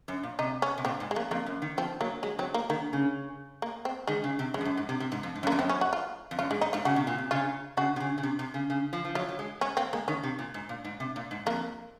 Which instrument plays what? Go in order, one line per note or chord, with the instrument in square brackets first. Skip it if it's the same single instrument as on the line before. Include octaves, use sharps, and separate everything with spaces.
[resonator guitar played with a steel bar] F#2
A#2
[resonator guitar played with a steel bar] C3 [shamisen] D#4
[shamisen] C#4
[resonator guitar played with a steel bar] C3
[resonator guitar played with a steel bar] A#2 [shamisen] C4
[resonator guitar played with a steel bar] G#2
[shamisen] G#3
[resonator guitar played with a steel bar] F2 [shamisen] A#3
[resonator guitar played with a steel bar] F2 [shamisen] A#3
[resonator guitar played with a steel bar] F#2
D#3
[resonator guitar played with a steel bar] F3 [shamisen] C4
[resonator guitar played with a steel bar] F#3 [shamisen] A#3
[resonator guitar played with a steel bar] F#3 [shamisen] G#3
[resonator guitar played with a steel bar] F#3 [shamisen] C4
[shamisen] A#3
[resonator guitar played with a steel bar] D#3 [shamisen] A#3
[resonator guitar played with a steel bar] C#3
[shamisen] A#3
C4
[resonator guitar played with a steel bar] D#3 [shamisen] G#3
[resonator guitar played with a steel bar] C#3
C3
[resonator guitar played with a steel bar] F#2 [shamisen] G#3
[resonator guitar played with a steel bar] F2
F#2
G#2
C3
C3
G#2
F2
G#2
F#2
[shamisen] A#3
[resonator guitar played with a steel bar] F2
[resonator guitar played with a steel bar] F#2 [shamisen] C4
[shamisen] C#4
F#4
F4
[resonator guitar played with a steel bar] F2
[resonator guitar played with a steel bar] F#2 [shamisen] F4
[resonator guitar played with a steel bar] G#2 [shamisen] G#3
[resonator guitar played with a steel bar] G#2 [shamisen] D#4
[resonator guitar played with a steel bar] G#2 [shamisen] F4
[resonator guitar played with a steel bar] C#3 [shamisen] F#4
[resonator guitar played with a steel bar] C3
A#2
C3
[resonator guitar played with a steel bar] C#3 [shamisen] F4
[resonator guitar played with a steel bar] C#3 [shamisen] F#4
[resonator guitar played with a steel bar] C3
C#3
C#3
C3
C3
C#3
C#3
F3
F3
[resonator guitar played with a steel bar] F#3 [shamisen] F4
[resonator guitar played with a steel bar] F#3
G#3
[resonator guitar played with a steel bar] G#3 [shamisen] C#4
[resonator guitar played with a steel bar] A#3 [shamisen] C4
[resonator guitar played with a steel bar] G#3 [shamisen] A#3
[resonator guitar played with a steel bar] D#3 [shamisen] C#4
[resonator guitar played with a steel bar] C3
A#2
G#2
A#2
G#2
C3
A#2
G#2
[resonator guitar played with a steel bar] F2 [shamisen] A#3